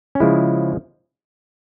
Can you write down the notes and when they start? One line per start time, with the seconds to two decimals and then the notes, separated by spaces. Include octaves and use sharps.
0.15 C#4
0.20 C#3 F3 G#3 E4